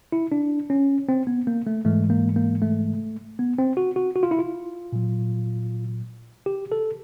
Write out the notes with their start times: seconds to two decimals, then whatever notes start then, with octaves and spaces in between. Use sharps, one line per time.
0.12 E4
0.32 D4
0.70 C#4
1.09 C4
1.27 B3
1.47 A#3
1.67 A3
1.85 G#2 E3 G#3 A3
2.10 A#3
2.36 A#3
2.62 A3
3.39 B3
3.59 C4
3.77 F#4
3.96 F#4
4.16 F#4
4.23 F4
4.31 E4
4.39 F4
4.92 A#2 F#3
6.46 G4
6.72 A4